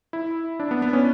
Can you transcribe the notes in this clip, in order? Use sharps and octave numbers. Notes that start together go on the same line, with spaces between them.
E4
D4
B3
B3
C#4